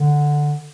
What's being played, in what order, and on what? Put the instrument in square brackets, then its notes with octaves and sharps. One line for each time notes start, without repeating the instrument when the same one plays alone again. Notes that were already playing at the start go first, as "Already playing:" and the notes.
Already playing: [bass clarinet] D3